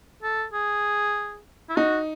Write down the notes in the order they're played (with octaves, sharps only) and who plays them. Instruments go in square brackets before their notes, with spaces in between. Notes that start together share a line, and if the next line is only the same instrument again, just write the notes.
[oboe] A4
G#4
E4
[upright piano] D#4 [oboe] F#4